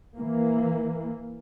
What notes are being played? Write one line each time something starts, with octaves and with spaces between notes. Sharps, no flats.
E3 A#3